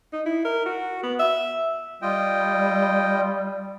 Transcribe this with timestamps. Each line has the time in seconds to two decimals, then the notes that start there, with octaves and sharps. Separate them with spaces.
0.13 D#4
0.26 E4
0.45 A#4
0.66 F#4
1.03 B3
1.19 E5
2.02 G3 F4 D#5 G5